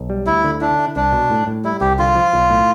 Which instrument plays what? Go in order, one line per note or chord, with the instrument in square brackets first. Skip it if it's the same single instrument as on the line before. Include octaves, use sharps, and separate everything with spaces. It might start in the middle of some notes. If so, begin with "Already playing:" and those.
Already playing: [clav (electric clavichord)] B1
G3
[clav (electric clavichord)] D2 [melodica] E4
[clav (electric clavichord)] D3
[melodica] D4 [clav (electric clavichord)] E4
[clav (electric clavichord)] E4
[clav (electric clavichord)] C2 [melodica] D4
[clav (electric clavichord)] B2
A2
A2
[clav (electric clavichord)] G3 [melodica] E4
[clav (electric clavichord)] C2 [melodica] G4
[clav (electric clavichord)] D3 [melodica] F4
[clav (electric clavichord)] F3
B1
A2